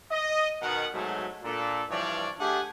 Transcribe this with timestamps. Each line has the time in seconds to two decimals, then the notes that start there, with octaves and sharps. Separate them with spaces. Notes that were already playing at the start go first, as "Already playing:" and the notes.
0.11 D#5
0.61 B2 D#3 F#5
0.93 G#2 B2 F#3 G#3 A3
1.44 A#2 D4 A4
1.90 G2 E3 F3 D4 C#5 D5
2.39 A3 D4 G4 G#4 F#5 G#5